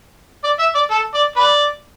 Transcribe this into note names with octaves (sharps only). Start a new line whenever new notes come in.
D5
E5
D5
A4
D5
B4 D5